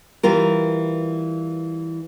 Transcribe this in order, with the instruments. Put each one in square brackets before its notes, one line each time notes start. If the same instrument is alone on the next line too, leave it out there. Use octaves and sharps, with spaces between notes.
[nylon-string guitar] E3 G3 F4 A#4